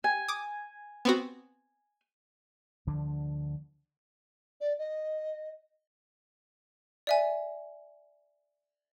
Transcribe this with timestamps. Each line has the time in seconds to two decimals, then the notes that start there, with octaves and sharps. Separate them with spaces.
0.04 G#5
0.28 D6 D#6
1.05 B3 C4 F#4
2.87 D2 D3 F3 D4
4.61 D5
4.79 D#5
7.07 D5 E5 G#5